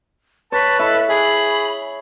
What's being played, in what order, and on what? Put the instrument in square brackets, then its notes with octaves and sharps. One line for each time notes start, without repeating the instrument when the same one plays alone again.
[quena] B4 [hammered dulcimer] C#5 [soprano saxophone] A5
[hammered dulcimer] E4 [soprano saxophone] A4
[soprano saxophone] G#4 [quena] B5